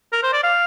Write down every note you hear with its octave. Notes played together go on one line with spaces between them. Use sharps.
A#4
C5
D5
F5